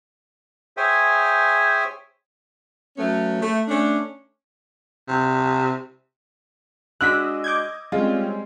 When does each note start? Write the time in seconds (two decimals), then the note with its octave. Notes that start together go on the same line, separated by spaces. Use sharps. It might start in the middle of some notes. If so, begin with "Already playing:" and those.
0.77 G#4 C5 C#5 E5 G5 G#5
2.97 F#3 A3 B3 C#4
3.41 A3
3.68 A3 C#4 D4
5.08 C3
7.01 G#3 D4 F#4 D#5 E6 F#6 B6
7.44 D6 G6 G#6
7.92 G3 G#3 C4 C#4 F4